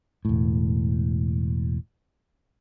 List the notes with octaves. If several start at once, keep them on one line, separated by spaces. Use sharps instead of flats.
E1 A2